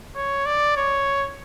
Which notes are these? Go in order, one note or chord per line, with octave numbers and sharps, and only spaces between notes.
C#5
D5
C#5